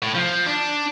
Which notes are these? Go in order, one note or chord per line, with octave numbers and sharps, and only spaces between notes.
A2
F3
D4